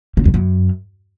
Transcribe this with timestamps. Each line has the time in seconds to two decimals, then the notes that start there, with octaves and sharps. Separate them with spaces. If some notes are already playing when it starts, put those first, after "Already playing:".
0.17 C#3
0.25 F2
0.34 F#2